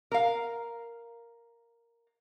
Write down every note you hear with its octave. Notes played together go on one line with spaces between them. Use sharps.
A#4 F5